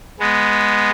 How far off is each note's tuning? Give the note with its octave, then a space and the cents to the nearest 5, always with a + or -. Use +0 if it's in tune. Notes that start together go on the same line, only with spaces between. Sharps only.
G#3 +0 B3 +0